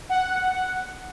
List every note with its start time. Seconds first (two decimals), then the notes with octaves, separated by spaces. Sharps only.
0.09 F#5